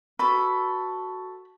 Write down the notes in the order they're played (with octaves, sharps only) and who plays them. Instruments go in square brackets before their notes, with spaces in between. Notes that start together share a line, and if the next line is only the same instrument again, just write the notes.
[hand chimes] F#4 C#6 [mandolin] A4 B4 E6 [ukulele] B5